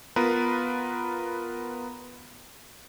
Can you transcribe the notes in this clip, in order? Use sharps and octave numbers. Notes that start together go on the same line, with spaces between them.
B3 F4 A#4 B4